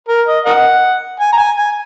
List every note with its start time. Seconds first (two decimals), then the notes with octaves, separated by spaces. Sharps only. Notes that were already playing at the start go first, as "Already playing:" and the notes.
0.09 A#4
0.27 D#5
0.46 A#4 D#5 F#5
1.20 G#5
1.33 A#5
1.38 G#5
1.57 G#5